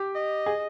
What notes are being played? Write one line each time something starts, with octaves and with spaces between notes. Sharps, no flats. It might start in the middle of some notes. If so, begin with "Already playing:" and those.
Already playing: G4
D#5
G#4